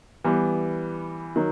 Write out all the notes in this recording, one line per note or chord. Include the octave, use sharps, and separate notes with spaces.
E3 G3 B3
D#3 F#3